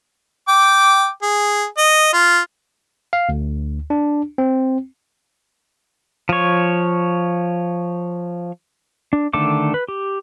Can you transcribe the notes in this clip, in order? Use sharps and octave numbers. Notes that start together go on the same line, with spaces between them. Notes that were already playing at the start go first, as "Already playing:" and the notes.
G5 D6
G#4
D#5
F4
F5
D2
D4
C4
F3 C#5
D4
D3 D#3 A3 A4 D6
B4
G4